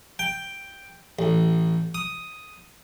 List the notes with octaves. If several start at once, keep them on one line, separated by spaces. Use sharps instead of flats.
G5
A1
D#6